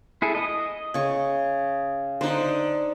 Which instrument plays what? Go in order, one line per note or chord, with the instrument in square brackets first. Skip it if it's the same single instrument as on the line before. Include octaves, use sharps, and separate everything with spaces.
[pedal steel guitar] E4 G#4 A4
D#5 D#6
[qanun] C#3 C#6
[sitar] D3 [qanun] D#4 C5